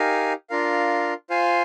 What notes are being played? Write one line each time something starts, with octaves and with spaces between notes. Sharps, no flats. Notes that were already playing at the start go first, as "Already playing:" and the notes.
Already playing: D#4 G4 A#4 F5 G#5
D4 F4 A#4 F5
F4 C5 F5 G#5